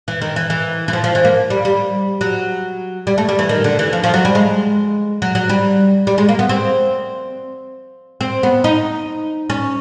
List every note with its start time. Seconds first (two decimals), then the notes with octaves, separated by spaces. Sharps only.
0.08 E3
0.21 D#3
0.36 E3
0.50 E3
0.88 E3
0.93 F3
1.04 F3
1.15 E3
1.25 A#3
1.50 G3
1.65 G3
2.21 F#3
3.07 G3
3.18 A3
3.29 G3
3.39 E3
3.49 D#3
3.64 D3
3.79 E3
3.93 F3
4.04 F3
4.14 F#3
4.25 G3
4.35 G#3
5.22 F#3
5.35 F#3
5.49 G3
6.07 G3
6.18 G#3
6.29 A#3
6.39 B3
6.49 C4
8.21 C4
8.43 B3
8.64 D#4
9.50 C#4